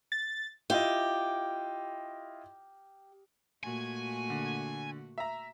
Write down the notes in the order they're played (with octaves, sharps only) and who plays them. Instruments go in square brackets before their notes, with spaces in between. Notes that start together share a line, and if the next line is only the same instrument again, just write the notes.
[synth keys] A6
[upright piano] E4 F4 D#5 [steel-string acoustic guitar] G4
[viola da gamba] A#2 A3 F#4 [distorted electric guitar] G#5
[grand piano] D3
E5 A#5